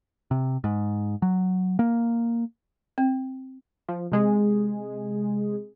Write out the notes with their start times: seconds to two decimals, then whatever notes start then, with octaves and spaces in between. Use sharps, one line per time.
0.31 C3
0.64 G#2
1.22 F#3
1.79 A#3
2.98 C4
3.89 F3
4.12 C3 G#3 G#4